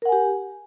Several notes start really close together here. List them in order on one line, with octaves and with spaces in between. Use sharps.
A#4 F#5 G#5 G4